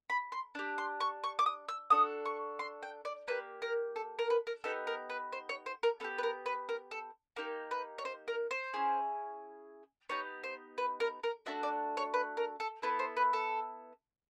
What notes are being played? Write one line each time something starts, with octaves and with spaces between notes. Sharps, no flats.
B5
C6
D4 G4
C6
C#6
C#6
D6
D#6
E6
D4 F#4 A4 D#6
C#6
C6
G5
D5
A#3 D4 G4 B4
A#4
A4
A#4
B4
A#4
B3 D#4 G4 A4
A#4
B4
C5
C#5
C5
A#4
B3 D4 G4 A4
B4
A#4
B4
A#4
A4
A#3 D#4 G4 A#4
B4
C#5
C5
A#4
C5
C#4 E4 G#4
B3 D#4 G4 C#5
C5
B4
A#4
A#4
A3 D4 F#4 E5
D5
C#5
B4
A#4
A4
B3 E4 A4 B4
C5
B4
A4